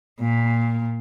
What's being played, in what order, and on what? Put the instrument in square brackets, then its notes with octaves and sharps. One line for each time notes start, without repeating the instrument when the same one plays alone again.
[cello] A#2